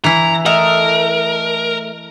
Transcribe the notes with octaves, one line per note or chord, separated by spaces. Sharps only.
E3 E4 A#5
A3 A#4 D#5